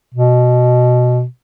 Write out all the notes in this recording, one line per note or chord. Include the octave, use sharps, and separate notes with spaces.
B2